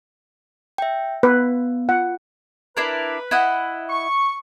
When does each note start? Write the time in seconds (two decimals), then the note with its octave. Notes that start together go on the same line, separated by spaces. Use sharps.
0.78 E5 G5
1.23 B3 B4
1.89 F4 F#5
2.77 D4 E4 A#4 B4
3.31 E4 D#5 F#5
3.89 C#6